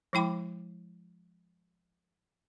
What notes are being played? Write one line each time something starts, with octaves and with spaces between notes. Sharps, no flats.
F3 G#3 E4 G5 B5 D6